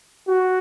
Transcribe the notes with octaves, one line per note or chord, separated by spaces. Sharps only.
F#4